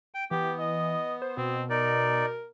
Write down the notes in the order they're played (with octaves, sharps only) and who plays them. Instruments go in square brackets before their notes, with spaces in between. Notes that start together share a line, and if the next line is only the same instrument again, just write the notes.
[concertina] G5
[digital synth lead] E3 [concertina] B3 [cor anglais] G4
[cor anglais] D#5
[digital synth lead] C5
[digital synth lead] B2 [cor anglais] C4
[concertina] D#4 D5 [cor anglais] A#4